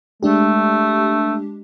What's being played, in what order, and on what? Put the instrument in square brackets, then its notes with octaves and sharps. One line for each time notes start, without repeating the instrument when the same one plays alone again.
[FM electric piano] G#3 D4 G4 [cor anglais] A3